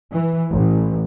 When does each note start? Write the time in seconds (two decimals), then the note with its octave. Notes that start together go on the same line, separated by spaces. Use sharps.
0.13 E3
0.51 A1